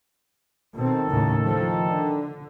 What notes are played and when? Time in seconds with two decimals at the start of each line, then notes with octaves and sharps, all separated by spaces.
0.76 B2 D#3 C4 A4
1.10 D#2 A2 C#3
1.45 F3
1.86 D3